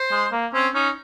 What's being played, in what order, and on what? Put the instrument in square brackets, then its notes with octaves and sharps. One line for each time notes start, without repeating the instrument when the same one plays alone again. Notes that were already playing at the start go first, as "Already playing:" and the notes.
Already playing: [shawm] C5
[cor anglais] G#3
A#3
[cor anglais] C4 [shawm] C#4
[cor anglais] C#4 [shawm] D#4